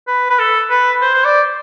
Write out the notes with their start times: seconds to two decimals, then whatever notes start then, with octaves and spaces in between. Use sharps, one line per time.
0.07 B4
0.30 B4
0.39 A4
0.70 B4
1.02 C5
1.14 C5
1.25 D5